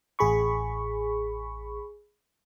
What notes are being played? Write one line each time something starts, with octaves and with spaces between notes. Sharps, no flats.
A1 G#4 B5 C#6